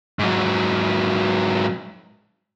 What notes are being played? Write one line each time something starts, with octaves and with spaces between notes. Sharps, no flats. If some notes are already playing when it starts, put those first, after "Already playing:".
G#2 F#3